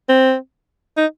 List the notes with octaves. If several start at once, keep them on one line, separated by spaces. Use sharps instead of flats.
C4
D#4